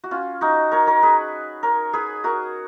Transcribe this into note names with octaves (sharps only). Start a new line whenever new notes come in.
F#4
C#4 F4
D#4 F#4
A#4 C#5
A#4 C#5
G#4 B4
A#4 C#5
G#4 B4
F#4 A#4